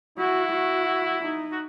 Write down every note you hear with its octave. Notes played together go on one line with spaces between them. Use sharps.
E4 F#4
F#4
D#4
F#4